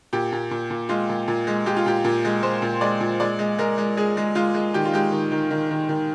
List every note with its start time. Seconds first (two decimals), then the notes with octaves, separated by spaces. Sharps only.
0.13 A#2 G4
0.32 A#2
0.51 A#2
0.70 A#2
0.89 G#3 F4
1.09 A#2
1.28 A#2
1.47 G#3
1.66 G#3 G4
1.77 F4
1.86 A#2 G4
2.04 A#2
2.25 G#3
2.43 G#3 C5
2.62 A#2
2.81 G#3 D5
3.00 A#2
3.20 G#3 D5
3.39 G#3
3.58 G#3 A#4
3.78 G#3
3.97 G#3 G#4
4.17 G#3
4.35 G#3 F4
4.54 G#3
4.74 D#3 G4
4.85 F4
4.93 G#3 G4
5.12 D#3
5.32 D#3
5.51 D#3
5.71 D#3
5.89 D#3